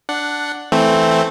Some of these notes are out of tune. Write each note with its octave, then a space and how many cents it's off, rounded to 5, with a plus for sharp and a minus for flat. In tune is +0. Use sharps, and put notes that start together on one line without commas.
D4 +0 F#5 +0
E3 +0 A3 +0 C4 +0